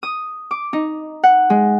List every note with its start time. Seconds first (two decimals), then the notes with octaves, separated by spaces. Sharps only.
0.03 D#6
0.51 D6
0.73 D#4
1.24 F#5
1.50 G#3